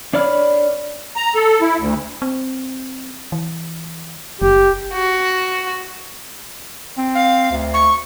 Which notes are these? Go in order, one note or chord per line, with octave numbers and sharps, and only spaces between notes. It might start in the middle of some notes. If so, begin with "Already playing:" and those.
D4 C#5 D5 B5 F6
A#5
A4
E4
D2
C4
E3
F#1 G4
F#4
C4
F5
D2
C#6